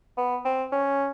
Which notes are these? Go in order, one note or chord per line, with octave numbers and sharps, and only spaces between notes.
B3
C4
C#4